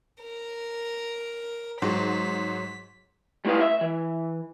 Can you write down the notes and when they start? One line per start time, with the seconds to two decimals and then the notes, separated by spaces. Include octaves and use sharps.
0.24 A#4
1.82 G#2 F#3 B6
3.45 G3 A3 E4 B4 F5
3.61 E5
3.81 E3